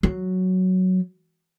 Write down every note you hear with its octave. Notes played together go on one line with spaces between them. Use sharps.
F#3